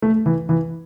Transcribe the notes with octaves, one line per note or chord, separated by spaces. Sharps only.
A3
E3
E3